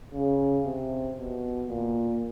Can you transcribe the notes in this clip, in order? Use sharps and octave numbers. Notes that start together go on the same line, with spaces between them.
C#3
C3
B2
A#2